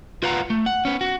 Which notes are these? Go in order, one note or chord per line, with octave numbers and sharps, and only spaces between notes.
F4 B4 F5 F#5 A#5
A3
F#5
B3 C#4
F#4